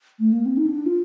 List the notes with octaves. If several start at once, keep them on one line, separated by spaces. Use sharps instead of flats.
A3
A#3
C4
D#4
D4
F4